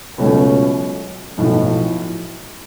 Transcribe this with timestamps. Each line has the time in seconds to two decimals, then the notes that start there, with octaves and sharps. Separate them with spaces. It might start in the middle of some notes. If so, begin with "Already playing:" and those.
0.18 C#2 B2 F#3 A3 C#4
1.37 B1 A2 F3